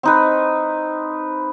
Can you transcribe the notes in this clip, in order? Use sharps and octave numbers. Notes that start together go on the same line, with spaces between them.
C4 D#4 B4